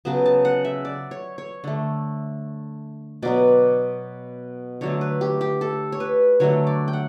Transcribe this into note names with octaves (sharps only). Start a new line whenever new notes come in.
C#3 F#3 B3 A5
A5
F#5
E5
D5
C#5
C#5
D3 A3
B2 F#3 B3 D5
D3 F#3 A3 C#5
B4
G4
G4
A4
C#5
B4
D3 F#3 A3 C#5
D5
G5
F#5